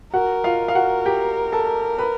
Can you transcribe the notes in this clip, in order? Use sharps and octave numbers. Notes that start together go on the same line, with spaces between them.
F#4 A#4 F#5
F4 F5
F5
F#4 F#5
G4 G5
A4 A5
B4 B5